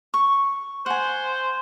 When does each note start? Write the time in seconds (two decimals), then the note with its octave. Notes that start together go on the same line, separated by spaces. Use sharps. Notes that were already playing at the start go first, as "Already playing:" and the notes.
0.14 C#6
0.86 C5 F#5 G#5